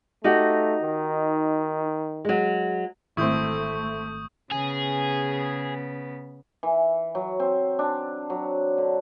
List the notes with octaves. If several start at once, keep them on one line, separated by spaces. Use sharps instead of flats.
A3 D#4 F#4 G4
D#3
F#3 G#3
G#1 A3 C4 E4 C#6 D#6 G6
C#3 B3 G#4
E3
F#3
C4
D4
F#3
D3